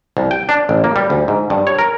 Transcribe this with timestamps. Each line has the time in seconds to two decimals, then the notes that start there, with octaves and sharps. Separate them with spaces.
0.17 C2
0.31 G5
0.49 D4
0.69 A1
0.84 A#3
0.96 G3
1.10 D2
1.28 G#2
1.50 G2
1.67 C#5
1.79 A#4